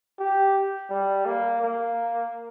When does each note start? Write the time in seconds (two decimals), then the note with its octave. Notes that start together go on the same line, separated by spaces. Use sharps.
0.19 G4
0.90 G3
1.26 A#3
1.62 A#3